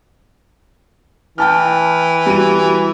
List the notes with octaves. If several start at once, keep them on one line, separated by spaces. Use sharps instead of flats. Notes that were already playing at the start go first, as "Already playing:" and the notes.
E3 G5 A5 F6
G3 F#4 D#7